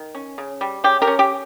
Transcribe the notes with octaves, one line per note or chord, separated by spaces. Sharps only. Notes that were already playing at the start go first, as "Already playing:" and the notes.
Already playing: D#3
C#4
C#3
G3
C#3 G4
G4 A#4
C#4
G4